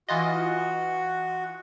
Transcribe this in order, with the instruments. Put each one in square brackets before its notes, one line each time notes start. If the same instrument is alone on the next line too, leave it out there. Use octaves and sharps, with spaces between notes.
[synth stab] E3 F4 D#5 [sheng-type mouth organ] F#4